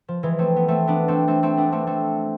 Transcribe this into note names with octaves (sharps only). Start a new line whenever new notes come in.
F3
E3 G#3
A3 C4
B3
A3 C4
B3 D4
A3 C4
A3 C4
A3 C4
B3 D4
A3 C4
A3 C4